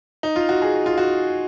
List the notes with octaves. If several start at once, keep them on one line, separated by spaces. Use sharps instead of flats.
D#4
F4
F#4
G#4
F4
F#4